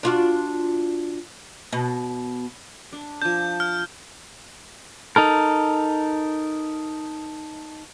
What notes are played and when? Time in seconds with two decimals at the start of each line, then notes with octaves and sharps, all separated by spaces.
0.03 D4 F4 F#4
1.72 B2
2.93 D4
3.22 F3 D4 G6
3.60 F6
5.16 D#4 A4 A#4